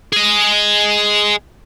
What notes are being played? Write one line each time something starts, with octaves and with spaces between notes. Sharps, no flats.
G#4 D#5